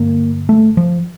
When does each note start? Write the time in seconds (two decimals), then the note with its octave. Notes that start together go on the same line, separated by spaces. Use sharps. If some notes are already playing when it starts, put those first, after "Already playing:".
Already playing: G2 D3 A#3
0.49 A3
0.77 F3